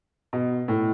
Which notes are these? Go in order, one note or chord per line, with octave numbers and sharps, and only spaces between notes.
B2
A2